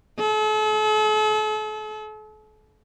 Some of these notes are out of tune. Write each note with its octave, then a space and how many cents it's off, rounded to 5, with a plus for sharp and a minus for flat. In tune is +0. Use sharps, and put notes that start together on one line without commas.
A4 -40